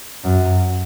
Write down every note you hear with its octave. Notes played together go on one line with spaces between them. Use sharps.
F#2